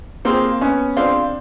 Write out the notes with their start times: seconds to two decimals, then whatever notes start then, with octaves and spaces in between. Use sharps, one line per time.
0.25 A#3 C4 F4 G#4 C5 F5
0.61 B3 C#4
0.96 C4 D4 F4 G#4 C5 F5